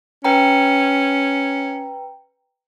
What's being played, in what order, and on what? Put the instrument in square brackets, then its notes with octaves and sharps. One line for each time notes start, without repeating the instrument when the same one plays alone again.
[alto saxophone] C#4 [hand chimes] B4 G5 A#5